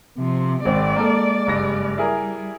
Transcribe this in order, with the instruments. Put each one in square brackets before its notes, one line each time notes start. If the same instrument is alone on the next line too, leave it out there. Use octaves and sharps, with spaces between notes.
[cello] C3 F3
[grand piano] G#1 C4 [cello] G#3 D5
[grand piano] A#3 A4
F#1 G2 A#6
[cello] G3 [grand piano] E4 G#4 A#4